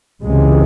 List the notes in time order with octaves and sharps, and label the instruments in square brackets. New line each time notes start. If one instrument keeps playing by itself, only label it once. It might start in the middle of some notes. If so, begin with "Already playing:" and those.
[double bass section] C#2 C3 E3 G#3